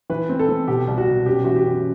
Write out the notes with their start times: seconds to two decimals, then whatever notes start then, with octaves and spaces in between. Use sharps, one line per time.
0.10 E3 B4
0.29 C4
0.39 A4
0.49 C4
0.68 B2 G4
0.88 C2
0.98 F#4
1.07 B2
1.26 F#2 G4
1.44 E3 F#4
1.56 G4
1.66 F#2